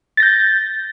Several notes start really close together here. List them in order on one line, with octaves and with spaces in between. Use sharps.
A6 A#6 G6